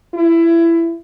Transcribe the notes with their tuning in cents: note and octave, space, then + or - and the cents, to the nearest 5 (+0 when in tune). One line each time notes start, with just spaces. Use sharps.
E4 +20